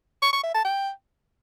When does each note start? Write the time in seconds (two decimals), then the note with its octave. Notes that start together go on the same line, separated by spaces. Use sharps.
0.22 C#6
0.33 C#6
0.43 E5
0.54 A5
0.65 G5